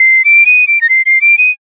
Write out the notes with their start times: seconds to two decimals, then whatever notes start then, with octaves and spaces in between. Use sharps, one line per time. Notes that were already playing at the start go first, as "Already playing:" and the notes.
Already playing: C7
0.25 D7
0.46 D#7
0.68 D7
0.81 A#6
0.90 C7
1.06 C7
1.21 D7
1.38 D#7